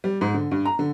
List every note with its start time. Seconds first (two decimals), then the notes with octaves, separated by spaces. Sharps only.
0.04 G3
0.21 G#2
0.34 D3
0.51 G2
0.65 A#5
0.79 D3